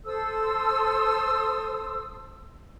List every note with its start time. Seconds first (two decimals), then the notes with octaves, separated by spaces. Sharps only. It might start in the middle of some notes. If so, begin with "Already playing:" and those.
0.05 A4 C5 D#6 E6